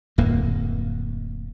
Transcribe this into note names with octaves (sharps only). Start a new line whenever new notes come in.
D1 F2 A#3